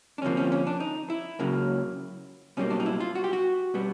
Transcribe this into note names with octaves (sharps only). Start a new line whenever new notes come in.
D4
D2 C3 F3 A#3 C#4
C#4
C#4
D4
D#4
E4
C#2 C#3 F#3 A#3
B1 B2 G3 A#3 C#4
D4
D#4
E4
F4
F#4
G4
F#4
B2 G3 B3